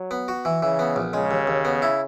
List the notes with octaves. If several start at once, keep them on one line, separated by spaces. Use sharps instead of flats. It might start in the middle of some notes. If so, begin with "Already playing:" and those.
Already playing: F#3
B3
F#4
E3
C#3 E3
B3
A#1
C#3 G#3
D#2
D#2
B3
E4